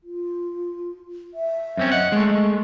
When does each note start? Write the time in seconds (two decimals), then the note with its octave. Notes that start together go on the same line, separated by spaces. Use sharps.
0.03 F4
1.34 E5
1.77 F#2 C4 C#4
1.92 D#5 F#5
2.12 G#3 A3